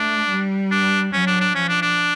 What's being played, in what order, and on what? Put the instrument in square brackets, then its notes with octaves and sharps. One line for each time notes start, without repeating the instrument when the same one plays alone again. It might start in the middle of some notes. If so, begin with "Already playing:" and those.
Already playing: [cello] A3 [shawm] D4
[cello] G3
[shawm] D4
[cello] F#3 [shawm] C#4
[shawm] D4
D4
[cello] F3 [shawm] C#4
[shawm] D4
D4